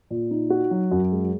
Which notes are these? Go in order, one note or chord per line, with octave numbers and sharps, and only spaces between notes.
A#2
D#4
F#4
F#3
F#2
G#3